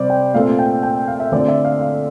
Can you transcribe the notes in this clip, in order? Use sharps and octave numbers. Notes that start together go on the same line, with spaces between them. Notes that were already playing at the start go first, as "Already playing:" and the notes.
Already playing: C3 G3 C4 C5 D5
G5
A#2 A3 C4 F5
G5
G5
F5
E5
D3 A3 C4 D5
E5
F5
F5